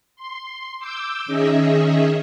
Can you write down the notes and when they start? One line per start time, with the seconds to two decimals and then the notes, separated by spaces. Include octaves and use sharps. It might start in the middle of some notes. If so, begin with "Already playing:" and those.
0.16 C6
0.78 D6 E6 G6
1.26 D#3 C#4 G#4 D#5 E5